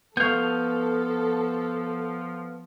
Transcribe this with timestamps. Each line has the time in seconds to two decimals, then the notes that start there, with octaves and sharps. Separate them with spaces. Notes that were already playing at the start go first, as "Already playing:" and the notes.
0.17 F3 B3 A4 F5 C#6 G6